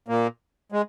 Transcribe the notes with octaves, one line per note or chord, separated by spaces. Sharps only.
A#2 A#3
G#3